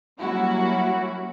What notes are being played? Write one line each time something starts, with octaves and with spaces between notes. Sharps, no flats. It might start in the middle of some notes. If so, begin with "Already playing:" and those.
F#3 G3 A#3 C#4 E4 F#4